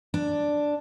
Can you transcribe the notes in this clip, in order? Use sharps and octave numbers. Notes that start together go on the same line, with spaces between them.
D4